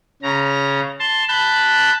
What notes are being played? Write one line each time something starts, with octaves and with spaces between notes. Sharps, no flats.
C#3 A#5
A5 C6
A5 B5 F#6 G6